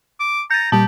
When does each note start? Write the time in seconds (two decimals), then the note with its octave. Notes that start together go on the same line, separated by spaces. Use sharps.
0.20 D6
0.51 A#5 G6 A6
0.72 A#2 G3 G4 A5